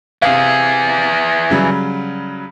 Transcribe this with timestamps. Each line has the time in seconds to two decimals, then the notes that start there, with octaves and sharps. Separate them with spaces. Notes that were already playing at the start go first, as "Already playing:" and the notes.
0.22 C3 E3 G#4 F5
1.50 C#3 F#3 G3